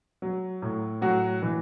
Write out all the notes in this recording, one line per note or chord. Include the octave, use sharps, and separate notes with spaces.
F#3
A2
A2 F#3 F#4
E3